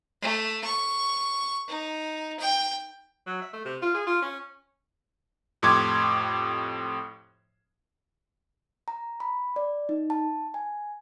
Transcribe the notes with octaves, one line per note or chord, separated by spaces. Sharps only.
A3
C#6
D#4
G5
F#3
E5
A3
C3
F4
G#4
F4
C#4
F2 A2 G4 C6 D6 G#6
A#5
B5
D5
D#4
A5
G#5